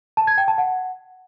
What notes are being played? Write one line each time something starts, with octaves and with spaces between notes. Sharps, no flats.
A5
G#6
G5
A5
F#5